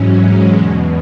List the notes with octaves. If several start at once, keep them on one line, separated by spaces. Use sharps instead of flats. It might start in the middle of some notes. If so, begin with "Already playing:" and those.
Already playing: G#2 E3 F#3 C#4
G#3
E2 B2 G#3